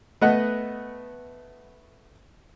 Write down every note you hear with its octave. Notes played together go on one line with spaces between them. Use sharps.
A3 B3 B4 D#5 F#5